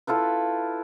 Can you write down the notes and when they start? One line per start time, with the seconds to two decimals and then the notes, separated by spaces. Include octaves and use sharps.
0.07 E4 F4 A4 B4